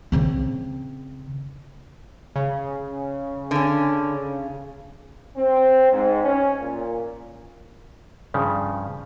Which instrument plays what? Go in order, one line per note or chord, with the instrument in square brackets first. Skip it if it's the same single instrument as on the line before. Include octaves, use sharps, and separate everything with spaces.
[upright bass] C#3 C4
[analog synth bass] C#3
[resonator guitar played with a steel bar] D3 C#4
[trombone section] C4
G#2
C#4
A#2
[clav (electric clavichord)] G2 C#3 F3